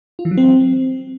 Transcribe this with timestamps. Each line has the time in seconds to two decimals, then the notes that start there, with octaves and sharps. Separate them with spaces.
0.19 F4
0.25 E3
0.31 F#3
0.37 C4